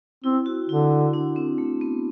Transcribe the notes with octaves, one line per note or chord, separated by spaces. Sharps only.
C4 E4
F#4
D3 E4
D4
C4
A3
B3